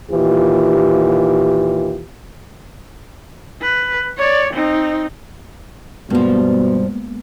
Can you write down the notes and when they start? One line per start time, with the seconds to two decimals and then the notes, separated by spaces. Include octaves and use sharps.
0.11 D#2 A#2 E3 F4 G4
3.62 B4
4.18 C#5 D5
4.53 C4 D#4
6.10 G2 B2 F3 G#3 A#3 B3